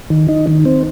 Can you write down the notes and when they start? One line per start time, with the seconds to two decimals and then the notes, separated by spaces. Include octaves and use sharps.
0.10 D#3
0.28 D#4
0.47 D#3
0.65 C4